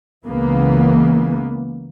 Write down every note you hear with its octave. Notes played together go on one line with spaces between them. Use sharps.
C#2 C#3 E3 A#3 B3